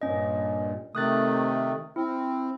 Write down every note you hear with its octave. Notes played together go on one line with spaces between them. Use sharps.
G2 A#2 C#4 D#5
C3 D#3 A3 D#6 F#6 A6
C4 E4